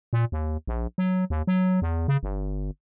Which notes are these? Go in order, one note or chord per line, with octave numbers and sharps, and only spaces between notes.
A#2
D#2
A#1
F#3
D#2
F#3
E2
C#3
G1